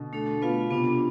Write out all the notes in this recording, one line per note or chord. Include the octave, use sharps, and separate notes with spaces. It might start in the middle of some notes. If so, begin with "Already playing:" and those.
Already playing: B2 D3
A3 D4 A4
B3 F4 B4 F5
C3 B3 D4 F4